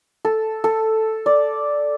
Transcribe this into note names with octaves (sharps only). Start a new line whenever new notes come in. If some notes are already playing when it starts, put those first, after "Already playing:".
A4
A4
D5